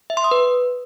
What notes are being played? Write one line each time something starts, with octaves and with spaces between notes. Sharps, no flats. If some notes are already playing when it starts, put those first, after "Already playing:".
E5
C6
D#6
B4